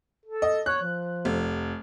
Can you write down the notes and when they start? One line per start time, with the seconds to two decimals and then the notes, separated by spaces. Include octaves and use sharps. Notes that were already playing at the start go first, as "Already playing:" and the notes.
0.26 A4
0.42 D#5
0.66 C#5 F#6
0.82 F3
1.25 F1